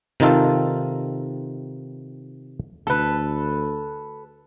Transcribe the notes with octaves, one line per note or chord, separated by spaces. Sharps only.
C3 D#3 D#4 F4 A4
D2 A4 B4